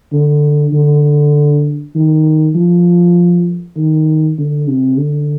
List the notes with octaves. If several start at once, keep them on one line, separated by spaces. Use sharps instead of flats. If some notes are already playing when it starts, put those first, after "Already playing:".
D3
D3
D#3
F3
D#3
D3
C3
D3